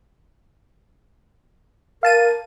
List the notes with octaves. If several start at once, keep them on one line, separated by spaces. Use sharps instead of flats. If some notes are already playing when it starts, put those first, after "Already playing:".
A#4 F5 A5 D#7